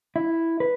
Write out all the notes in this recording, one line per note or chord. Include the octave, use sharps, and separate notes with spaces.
E4
B4